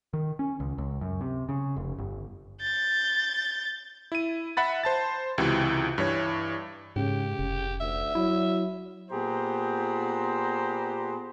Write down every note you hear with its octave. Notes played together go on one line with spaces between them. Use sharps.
D#3
C#4
C#2
C#2
F#2
C3
C#3
F1
G1
G6 A6
E4 D#7
E5 F#5 B5 A6
C5 A5 A6
C#2 C3 E3 F#4
G2 E3 C#5
G#2 C#3 G4
F1 C#3
D2 E5
F#3 E4
A#2 B3 G4 G#4 C5 A#5